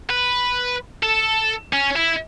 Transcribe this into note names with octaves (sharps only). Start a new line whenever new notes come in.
B4
A4
C#4
E4